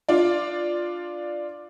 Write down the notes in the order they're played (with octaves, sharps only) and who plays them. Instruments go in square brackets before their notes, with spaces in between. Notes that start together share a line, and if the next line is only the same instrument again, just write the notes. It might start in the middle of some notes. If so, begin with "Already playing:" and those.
[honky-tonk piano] D4 F4 D5